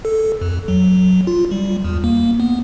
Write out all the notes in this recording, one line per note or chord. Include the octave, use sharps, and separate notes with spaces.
A4
F2
F#3
F4
G3
E2
A#3
B3